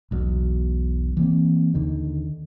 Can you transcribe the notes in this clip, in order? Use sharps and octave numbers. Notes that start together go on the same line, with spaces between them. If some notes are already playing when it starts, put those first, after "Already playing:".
E1 B1 B2
E3 A#3 C4
D#2 D3 D#3